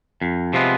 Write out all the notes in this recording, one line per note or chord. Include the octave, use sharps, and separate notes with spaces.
F2
C3 F3 G#3 B3